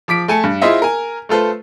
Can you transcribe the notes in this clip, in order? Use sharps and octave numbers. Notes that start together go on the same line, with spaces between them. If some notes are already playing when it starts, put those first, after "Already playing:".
F3 D6 B6 D7
A3 G#5 A5 C#7
G2
E4 F4 G#4 C5 D#5 E5
A#4 G#5
A3 F4 A4 B4 C5